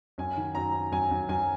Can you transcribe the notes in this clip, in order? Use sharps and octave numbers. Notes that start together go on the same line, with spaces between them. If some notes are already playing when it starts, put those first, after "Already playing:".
F#2 G#5
D#3
F#2 A#5
D#3
F#2 G#5
F#2
F#2 G#5